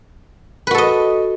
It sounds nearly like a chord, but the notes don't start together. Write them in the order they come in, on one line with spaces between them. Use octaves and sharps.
B4 F#4 A4 D#5